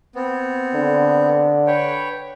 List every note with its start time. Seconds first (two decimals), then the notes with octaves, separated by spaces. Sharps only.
0.15 B3 C4
0.74 D3
1.67 B4 C#5 G5